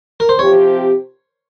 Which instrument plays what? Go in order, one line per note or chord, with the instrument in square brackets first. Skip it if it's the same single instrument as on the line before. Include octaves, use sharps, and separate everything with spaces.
[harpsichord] A#4
C5
[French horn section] C3 F3 C4 G4 [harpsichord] C#5